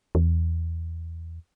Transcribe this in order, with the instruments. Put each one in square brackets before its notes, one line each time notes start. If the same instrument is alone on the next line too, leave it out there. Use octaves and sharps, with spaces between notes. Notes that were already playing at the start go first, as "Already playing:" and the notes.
[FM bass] E2